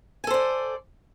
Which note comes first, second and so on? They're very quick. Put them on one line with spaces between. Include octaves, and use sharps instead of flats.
G#5 A4 C5 D5